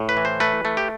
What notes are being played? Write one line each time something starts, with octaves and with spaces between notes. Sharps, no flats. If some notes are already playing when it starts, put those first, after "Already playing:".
Already playing: A2
B4
E3
C5
A3 B4
A3
G4